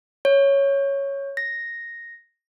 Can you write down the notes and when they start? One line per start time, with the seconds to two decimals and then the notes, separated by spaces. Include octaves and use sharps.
0.25 C#5
1.37 A#6